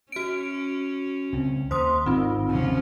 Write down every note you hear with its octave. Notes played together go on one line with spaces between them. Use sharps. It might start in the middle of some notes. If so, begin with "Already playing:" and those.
C#4 F#4 D7
C#2 C4
D#2 D#3 C5 C6 D#6
G#1 C4 D#4 F4
F#1 D#2 C3 F3 C#4